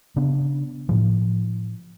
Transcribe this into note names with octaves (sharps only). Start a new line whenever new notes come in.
C#3 B3 D4
A2 F3